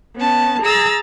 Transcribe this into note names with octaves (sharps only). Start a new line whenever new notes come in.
B3 C#4 A5
G#4 A#5 E6 A6